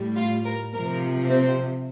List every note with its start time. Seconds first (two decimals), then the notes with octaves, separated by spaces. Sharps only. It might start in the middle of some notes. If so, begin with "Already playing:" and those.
Already playing: A2 G3
0.17 F4 F5
0.46 A#4
0.74 C3 F3 A#4
1.29 C4 C5